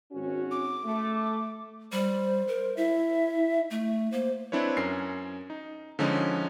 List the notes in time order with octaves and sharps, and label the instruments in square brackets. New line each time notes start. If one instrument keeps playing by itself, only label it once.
[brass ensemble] G#1 C#4 F#4
[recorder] D6
[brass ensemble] A3
[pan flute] G3 [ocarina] C5
[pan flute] A#4
[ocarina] E4 [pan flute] E5
[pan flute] A3
[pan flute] A#3 [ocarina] C5
[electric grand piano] C4 D4 E4 B4 C#5
F#2 C#4 A#4 C7
D#4
D3 F3 G#3 C#4 D#4